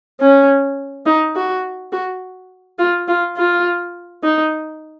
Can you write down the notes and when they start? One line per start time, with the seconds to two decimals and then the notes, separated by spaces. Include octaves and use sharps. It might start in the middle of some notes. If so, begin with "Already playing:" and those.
0.20 C#4
1.06 D#4
1.36 F#4
1.92 F#4
2.79 F4
3.08 F4
3.37 F4
4.23 D#4